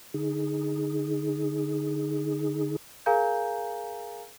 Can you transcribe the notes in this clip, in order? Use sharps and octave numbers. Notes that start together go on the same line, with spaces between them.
D3 D#4 G#4
G#4 A#4 F5 G#5 A#5 G6